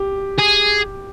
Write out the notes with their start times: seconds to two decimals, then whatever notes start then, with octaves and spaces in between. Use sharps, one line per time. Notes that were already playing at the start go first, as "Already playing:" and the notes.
Already playing: G4
0.39 G#4